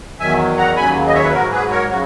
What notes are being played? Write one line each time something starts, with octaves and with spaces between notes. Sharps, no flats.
E2 D#3 F#3 E5 G#5
F#5 A#5
D#2 C#3 F#3 G#5 B5
D#5
C#5 E5
B4
G#2 F#3 F#4 A#4
G#4 B4
A#4 C#5
C#3 F#3 F#4